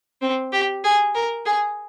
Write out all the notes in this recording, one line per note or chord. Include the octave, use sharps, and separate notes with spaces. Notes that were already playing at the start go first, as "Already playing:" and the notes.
C4
G4
G#4
A#4
G#4